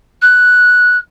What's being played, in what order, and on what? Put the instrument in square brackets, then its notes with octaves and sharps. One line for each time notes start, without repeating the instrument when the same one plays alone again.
[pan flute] F#6